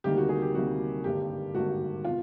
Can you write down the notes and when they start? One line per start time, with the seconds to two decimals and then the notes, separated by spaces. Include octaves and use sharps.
0.04 D2 C3 D#3 G3 A#3 G4
0.17 F#4
0.29 G#4
0.42 G4
0.55 D2 C3 D#3 G3 A#3 F#4
1.04 G#1 G2 D3 G3 A#3 G4
1.55 G#1 G2 D3 G3 A#3 F#4
2.05 B2 F4